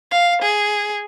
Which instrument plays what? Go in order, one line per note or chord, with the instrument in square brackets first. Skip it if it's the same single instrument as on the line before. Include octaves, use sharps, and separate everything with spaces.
[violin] F5
G#4